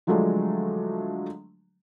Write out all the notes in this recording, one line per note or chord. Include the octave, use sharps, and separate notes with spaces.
D3 F3 F#3 G#3 A3 D4